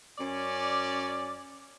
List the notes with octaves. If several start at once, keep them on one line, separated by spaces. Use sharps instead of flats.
F#2 C#4 D5